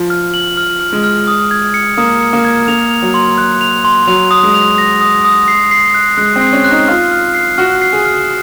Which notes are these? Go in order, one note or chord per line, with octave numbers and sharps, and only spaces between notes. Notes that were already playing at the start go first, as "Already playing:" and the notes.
Already playing: F3
F6
F#7
F6
F6
G#3
F6
D#6
G#6
C#7
A#3 D#6
C#7
A#3
G#6
A#3 F7
F7
F#3
C6
F#6
F7
C6
F#3 F7
D#6
G#3
F7
A#6
D#6
D#6
C7
C7
F#6
G#3 F#6
C4
C7
C#4
F#6
D#4
F4 F6
F6
C7
F#4 F6
C7
G#4
F6